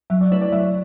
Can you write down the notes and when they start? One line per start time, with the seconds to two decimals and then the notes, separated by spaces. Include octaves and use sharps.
0.10 F#3 E5
0.21 D5
0.32 A3 E4 B4 C#5
0.41 D5
0.52 F#3 E5